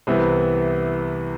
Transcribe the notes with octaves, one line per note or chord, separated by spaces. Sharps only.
C2 C3 E3 B3